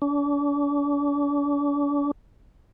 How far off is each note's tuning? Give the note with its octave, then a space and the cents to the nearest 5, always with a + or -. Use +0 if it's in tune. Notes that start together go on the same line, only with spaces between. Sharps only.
D4 -40